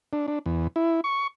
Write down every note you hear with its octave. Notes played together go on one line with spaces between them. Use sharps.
D4
D4
E2
E4
C#6